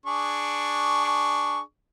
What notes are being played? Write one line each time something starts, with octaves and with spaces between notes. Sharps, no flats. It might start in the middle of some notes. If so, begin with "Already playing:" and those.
D4 G#4 C#6